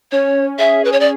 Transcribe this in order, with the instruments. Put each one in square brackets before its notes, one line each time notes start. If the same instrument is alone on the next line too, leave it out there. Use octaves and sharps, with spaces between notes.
[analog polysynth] C#4 [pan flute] C#5
[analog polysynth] G#4 [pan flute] E5
[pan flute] B4
C#5
D5